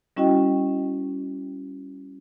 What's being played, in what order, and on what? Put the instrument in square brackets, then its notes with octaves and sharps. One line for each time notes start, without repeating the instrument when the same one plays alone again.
[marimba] G3 C#4 E4 F#4 D#5 G5